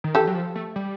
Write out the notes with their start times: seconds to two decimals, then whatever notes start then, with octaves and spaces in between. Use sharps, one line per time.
0.04 D#3
0.15 E3 G4 A4
0.27 F#3
0.35 F3
0.55 A3
0.76 G3